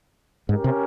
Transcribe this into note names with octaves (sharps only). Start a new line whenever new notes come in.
G#2 C#4 G4 A#4
C3